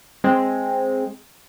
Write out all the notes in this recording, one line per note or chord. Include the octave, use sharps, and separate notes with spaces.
G#3 C4